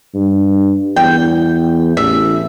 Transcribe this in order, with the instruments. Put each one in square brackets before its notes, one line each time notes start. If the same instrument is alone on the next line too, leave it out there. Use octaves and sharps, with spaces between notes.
[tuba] G2
[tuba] E2 [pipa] G5
[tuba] A1 [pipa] E5